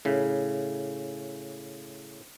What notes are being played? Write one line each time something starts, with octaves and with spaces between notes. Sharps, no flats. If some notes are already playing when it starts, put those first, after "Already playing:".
A2 C#3